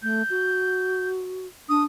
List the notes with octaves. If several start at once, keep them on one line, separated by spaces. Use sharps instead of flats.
A3 G6
F#4
D4 D#6